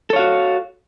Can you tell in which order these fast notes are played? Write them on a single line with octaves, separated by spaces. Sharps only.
A4 C#5 F5 F#4